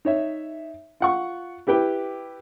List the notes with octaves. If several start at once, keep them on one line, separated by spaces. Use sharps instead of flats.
D#4 C#5 E5
F4 F#5 C#6
E4 G4 B4 G5